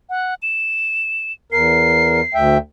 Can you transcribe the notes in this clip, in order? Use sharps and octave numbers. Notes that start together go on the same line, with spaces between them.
F#5
E7
E2 A#4 C7
D2 E5 G5